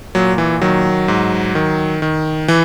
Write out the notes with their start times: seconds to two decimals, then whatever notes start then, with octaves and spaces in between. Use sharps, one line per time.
0.15 A#2 F#3
0.38 E3
0.61 D#3 F#3
1.08 G#2
1.55 D#3
2.02 D#3
2.48 E3